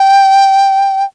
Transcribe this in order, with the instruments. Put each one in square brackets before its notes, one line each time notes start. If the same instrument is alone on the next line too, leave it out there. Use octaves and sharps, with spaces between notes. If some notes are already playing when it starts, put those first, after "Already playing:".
Already playing: [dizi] G5